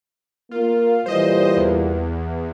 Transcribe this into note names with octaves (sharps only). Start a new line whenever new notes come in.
A#3 F4
A#2 E3 G3 C5 D#5
E2